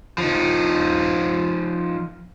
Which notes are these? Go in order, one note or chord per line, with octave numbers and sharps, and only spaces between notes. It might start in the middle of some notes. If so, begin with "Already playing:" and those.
F3 D#4